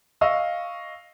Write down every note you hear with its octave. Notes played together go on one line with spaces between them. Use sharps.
D#5 F5 C#6 E6